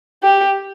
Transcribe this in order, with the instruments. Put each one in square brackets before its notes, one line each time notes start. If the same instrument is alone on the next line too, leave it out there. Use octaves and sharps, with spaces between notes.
[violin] G4